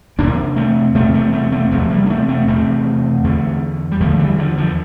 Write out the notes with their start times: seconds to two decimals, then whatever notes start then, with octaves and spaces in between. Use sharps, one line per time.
0.18 E2 C3 A#3 D4
0.56 A3 C4
0.95 E2 C3 A3 C4
1.14 A3 C4
1.33 A3 C4
1.52 A3 C4
1.72 E2 C3 F3 A3
1.90 G3 A#3
2.06 D4
2.10 A3 C4
2.29 A3 C4
2.47 E2 C3 A3 C4
3.24 E2 D3
3.92 G3
4.00 E2 D3 F3 A3
4.19 E3 G3
4.38 D3 F3
4.57 D3 F3